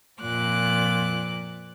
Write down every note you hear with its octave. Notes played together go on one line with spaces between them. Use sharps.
F2 A#2 D6 F#6